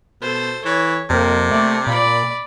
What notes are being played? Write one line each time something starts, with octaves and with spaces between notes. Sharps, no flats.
B2 A4 C5
E3 C#5
F2 C3 A#3
A3 D5
A#2 D5 B5